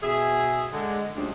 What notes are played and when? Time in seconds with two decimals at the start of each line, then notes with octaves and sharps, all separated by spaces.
0.01 B2 G#4 E5
0.72 D3 G#3
1.15 D2 C#3 F3 G3 G#3 D4